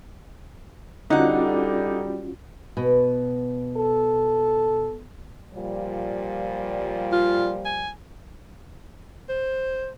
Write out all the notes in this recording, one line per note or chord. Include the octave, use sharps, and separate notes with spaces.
D3 G3 C#4 D#4 F4 F#4 F#5
B2
A4
A#2 F3 G3
F4
G#5
C5